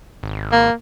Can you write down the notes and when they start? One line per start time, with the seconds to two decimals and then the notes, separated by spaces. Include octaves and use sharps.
0.23 G#1
0.52 A#3